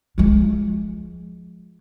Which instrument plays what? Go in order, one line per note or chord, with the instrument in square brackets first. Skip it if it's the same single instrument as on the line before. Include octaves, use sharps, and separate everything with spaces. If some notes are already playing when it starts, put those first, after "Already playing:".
[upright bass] F3 G#3